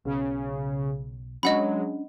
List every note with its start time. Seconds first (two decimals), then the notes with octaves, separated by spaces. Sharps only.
0.05 B1 C#3
1.43 F#3 G#3 C#4 D4 D#5 F#5 B5